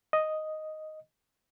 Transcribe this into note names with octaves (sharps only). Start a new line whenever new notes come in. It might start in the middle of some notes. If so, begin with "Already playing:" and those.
D#5